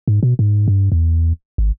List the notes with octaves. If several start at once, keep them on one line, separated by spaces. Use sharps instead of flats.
G#2
B2
G#2
G2
E2
G#1